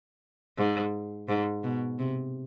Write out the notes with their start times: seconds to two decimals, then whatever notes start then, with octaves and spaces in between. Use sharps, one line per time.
0.58 G#2
1.28 G#2
1.63 B2
1.99 C3